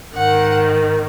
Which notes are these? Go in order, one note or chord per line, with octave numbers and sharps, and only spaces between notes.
G#2 D#3 F#5